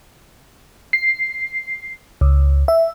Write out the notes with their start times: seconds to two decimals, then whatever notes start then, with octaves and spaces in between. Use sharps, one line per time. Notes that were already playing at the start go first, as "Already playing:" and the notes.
0.93 C7
2.21 C#2
2.68 E5